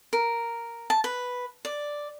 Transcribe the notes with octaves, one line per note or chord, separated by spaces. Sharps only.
A#4
A5
B4
D5